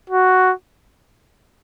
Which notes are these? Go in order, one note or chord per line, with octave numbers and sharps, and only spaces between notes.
F#4